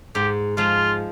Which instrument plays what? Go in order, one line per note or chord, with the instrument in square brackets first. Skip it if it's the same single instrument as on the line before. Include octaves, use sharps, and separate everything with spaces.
[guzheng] G#2 [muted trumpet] G4
[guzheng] F3 G#3 [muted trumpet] F4